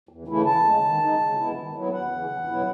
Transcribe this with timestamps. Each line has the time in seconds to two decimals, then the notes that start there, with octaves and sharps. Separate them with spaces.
0.09 E2
0.27 C#3 E3 A3 E4
0.45 E2 A5
0.64 C#3 G#3
0.83 D#3
1.00 G#3 D#4
1.19 C#3
1.37 G#3 B3 E4
1.55 D#3
1.74 F#3 B3 E4
1.93 E2 F#5
2.11 C#3 E3
2.29 E2
2.48 B2 F#3 B3 E4